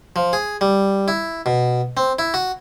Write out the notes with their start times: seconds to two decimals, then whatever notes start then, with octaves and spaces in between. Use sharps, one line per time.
0.16 F3
0.33 G#4
0.61 G3
1.08 E4
1.46 B2
1.97 C4
2.19 E4
2.34 F#4